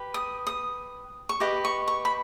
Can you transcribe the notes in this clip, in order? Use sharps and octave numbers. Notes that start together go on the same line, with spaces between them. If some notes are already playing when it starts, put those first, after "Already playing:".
Already playing: G4 B4
D#6
D#6
C#6
G4 B4 D#5 D6
C#6
C#6
B5